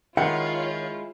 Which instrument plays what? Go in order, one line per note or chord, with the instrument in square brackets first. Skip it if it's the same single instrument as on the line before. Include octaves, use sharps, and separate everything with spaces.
[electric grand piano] D#3 [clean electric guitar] G#3 E4 [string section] F4 C#5 [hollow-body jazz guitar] F#5